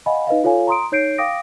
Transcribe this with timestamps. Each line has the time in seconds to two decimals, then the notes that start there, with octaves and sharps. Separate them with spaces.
0.06 D#5 F5 F#5 G#5 B5
0.27 D#4 B4 D#5 F5
0.44 F4 A4 C#5 F5 G#5
0.67 A#5 C6 D#6 D7
0.92 D#4 C#5 G6 C7 D7
1.18 F5 G5 D6 D#6 A#6 D7